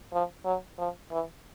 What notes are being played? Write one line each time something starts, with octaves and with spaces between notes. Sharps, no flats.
F3
F#3
F3
E3